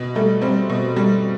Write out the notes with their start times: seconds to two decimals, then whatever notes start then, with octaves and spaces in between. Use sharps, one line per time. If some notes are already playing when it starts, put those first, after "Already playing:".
Already playing: B2
0.15 G3 A3
0.42 G3 C4
0.70 B2
0.96 G3